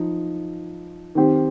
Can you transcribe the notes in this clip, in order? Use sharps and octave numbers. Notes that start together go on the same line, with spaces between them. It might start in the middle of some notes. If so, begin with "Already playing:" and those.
Already playing: F3 D#4
D#3 C4 G4